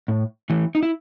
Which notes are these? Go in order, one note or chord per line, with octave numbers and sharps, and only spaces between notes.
A2
E3 A3
D#4
E4